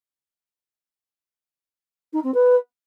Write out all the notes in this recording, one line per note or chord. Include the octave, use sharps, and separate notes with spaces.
D#4
C4
B4